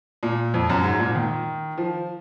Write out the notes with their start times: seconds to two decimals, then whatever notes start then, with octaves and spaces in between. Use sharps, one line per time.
0.23 A#2
0.54 F2
0.69 F#2
0.84 G#2
1.00 A#2
1.15 D#3
1.78 F3